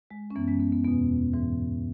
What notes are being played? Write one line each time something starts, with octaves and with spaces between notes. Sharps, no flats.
G#3
C#4
F#2 E3 B3
G#3 C#4
B3
B3
E2 B2 B3
G#2 E3